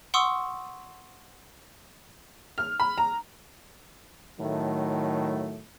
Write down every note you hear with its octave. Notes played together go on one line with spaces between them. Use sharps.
F#5 C6 C#6 D#6 E6
F6
B5
A#5
A2 D#3 F#3 A3